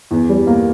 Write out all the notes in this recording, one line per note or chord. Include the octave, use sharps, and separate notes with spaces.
E2
G3
A#3